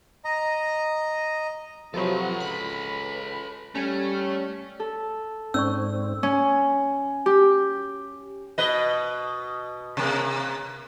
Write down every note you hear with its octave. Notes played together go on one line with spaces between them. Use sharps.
D#5 A#5
C3 F3 F#3 A4 B4
C#2 B5
G3 A3 C#4
A4
G#2 C4 C#4 D5 C#6 E6
C#4
G4
B2 B4 D#5
C3 A#3